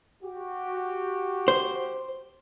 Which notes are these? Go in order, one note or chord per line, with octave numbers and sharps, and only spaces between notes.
F#4 G4
C5